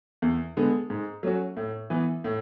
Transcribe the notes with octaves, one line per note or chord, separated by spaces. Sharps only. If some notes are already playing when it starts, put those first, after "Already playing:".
E2
D3 G#3 B3
G#2
F#3 A3 C#4 F#4
A2
E3 B3
A2